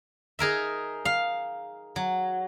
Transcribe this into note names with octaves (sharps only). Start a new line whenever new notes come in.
D#4 G#4 A#4 E5
F5
F#3